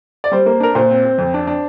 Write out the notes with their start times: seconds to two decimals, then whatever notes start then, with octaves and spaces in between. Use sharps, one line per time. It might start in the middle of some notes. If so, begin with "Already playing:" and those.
0.24 D5
0.31 G3 C5
0.46 A#3
0.60 D4 A#4
0.75 A#2 C5
0.90 C4
1.05 C4
1.18 F2
1.34 D4
1.47 D4